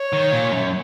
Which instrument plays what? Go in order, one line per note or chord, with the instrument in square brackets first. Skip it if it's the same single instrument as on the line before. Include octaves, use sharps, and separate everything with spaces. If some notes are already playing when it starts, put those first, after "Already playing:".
Already playing: [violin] C#5
[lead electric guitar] D#3
A#2
F#2